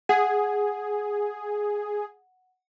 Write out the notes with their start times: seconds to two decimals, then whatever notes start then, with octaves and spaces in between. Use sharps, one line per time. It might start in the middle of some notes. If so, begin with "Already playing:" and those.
0.09 G#4 F#5